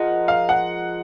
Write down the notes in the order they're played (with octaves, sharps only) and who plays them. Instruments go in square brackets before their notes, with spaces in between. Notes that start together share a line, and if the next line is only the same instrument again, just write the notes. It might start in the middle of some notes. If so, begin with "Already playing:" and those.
Already playing: [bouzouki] F3 G#3 D#4 A#4 [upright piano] F#5
[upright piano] F5
F#5